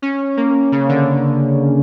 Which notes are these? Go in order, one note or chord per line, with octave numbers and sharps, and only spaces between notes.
C#4
A#3
C#3
D3